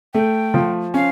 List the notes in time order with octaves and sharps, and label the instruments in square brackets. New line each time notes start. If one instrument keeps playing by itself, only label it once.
[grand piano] A3 [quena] G5
[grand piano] F3
[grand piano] C#4 [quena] F5